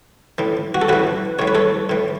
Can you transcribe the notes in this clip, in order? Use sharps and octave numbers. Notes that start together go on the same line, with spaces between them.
A2 E3
F#4
A4
A2 E3 F#4 B4
A2 E3 C#5
B4
A4 C#5
A2 E3